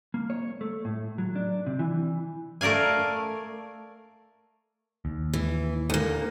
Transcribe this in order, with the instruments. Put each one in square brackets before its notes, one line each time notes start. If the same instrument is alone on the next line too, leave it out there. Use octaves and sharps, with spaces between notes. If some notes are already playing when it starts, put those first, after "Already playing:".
[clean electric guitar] A#3
C#5
A3
A2
F#3
D4
C3
E3
[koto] A3 A#4 D5 F5 G#5
[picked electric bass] D#2
[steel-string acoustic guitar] E3
D2 A#3